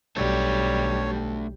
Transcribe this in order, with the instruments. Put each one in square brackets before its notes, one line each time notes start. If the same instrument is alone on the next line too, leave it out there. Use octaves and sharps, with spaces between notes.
[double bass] B1 [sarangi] G3 [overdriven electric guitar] A3 D4 [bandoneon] C#5